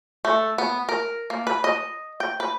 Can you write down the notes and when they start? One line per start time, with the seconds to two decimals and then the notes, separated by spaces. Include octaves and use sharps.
0.25 A3
0.58 B3
0.89 A#4
1.30 A#3
1.47 B4
1.64 D#5
2.20 G5
2.40 B4